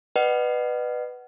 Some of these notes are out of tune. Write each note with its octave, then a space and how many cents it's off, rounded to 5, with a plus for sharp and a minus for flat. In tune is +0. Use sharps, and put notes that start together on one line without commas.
B4 +0 D#5 -45 F#5 +20